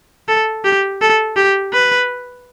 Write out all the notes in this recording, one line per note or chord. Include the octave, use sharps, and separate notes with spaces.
A4
G4
A4
G4
B4